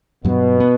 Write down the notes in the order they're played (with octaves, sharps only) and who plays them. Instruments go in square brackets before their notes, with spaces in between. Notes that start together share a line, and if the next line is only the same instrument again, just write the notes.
[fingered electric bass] G2 F#3 B3 [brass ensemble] B2
[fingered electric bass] B3